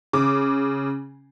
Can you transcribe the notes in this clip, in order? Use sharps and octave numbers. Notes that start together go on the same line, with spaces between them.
C#3 D6